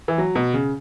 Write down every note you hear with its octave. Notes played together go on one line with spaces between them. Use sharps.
E3
F#3
B2
C#3